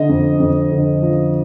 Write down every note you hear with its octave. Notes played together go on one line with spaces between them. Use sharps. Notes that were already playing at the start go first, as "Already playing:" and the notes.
Already playing: D3 D#5
F2
F2
D3
F3